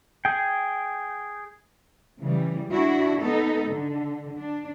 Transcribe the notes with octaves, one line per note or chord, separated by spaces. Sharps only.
G#4 G5
C#3 E3 G3
D4 E4 F#4
B3 D#4 A4
D3
D4